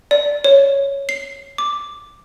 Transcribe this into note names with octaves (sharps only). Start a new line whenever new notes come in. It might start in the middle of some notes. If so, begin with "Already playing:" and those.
D5
C#5
C7
D6